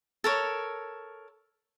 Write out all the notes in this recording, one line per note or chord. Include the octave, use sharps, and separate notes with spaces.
A4 A#4 C#5